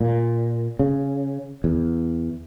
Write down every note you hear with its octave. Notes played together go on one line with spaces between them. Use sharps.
A#2
C#3
E2